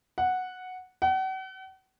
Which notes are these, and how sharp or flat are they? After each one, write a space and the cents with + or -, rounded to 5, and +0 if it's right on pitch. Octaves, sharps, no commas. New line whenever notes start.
F#5 -5
F#5 +40